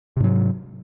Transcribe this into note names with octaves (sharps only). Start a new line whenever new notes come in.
G#2 C3 F#3